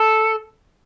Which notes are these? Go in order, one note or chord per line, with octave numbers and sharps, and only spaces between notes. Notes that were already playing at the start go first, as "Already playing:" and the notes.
Already playing: A4